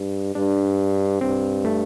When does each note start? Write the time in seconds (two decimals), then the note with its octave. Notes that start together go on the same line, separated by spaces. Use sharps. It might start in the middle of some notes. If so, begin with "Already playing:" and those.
Already playing: G2
0.35 G2 D4
1.21 G2 C4
1.65 A3